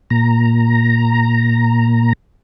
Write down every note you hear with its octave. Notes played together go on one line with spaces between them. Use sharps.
A#2 A#5